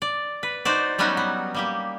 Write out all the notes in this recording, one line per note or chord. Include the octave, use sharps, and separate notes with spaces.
D5
B4
D#4 F#4 C5 D5
F#3 G3 B3 C#4 D#4 F#4
B3
G3 A#3 G4